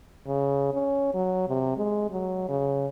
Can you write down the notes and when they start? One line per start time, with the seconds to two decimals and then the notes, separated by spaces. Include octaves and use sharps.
0.27 C#3
0.74 C#4
1.14 F#3
1.48 C3
1.77 G#3
2.11 F#3
2.48 C#3